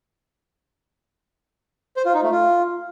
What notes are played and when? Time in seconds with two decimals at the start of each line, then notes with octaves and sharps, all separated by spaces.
1.97 C5
2.05 F4
2.14 D#4
2.23 A3
2.32 F4